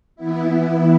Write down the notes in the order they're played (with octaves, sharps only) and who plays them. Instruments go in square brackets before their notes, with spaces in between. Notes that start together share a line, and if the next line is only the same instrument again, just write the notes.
[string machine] E3 B3 E4